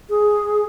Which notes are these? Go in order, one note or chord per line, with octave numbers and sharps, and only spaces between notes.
G#4